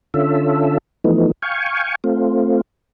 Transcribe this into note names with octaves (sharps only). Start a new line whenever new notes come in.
D3 C#4 F4 A4 E5
E3 F3 A3 B3 D#4
F5 G5 G#5 C#6
A3 C4 F4